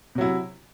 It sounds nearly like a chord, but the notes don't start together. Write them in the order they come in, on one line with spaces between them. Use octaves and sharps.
C3 F#3 E4